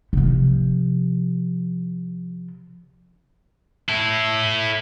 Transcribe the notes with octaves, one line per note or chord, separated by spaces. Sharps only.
C3 F3
E4 A4